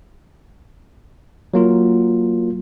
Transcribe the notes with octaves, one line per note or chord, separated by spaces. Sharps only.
F#3 A#3 F4